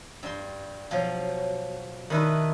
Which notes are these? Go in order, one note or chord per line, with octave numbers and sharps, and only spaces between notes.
G2 C6
B2 F3 F#3
D#3 D4 E4 B4